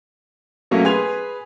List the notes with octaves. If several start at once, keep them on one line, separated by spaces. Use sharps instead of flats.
B2 F#3 A3 A#3 C#4
G#4 B4 G#5 C6 G#6 F7